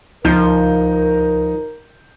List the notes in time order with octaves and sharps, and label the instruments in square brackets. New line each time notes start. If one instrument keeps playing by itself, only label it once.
[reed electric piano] C#2 [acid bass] F3 [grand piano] D#4 G6 [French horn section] A#4